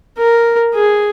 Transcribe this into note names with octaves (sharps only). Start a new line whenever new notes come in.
A#4
G#4